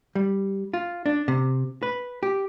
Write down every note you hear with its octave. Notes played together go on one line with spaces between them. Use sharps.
G3
F4
D4
C3
B4
G4